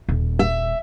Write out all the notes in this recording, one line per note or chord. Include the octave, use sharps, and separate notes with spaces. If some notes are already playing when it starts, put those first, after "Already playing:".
D#1
E5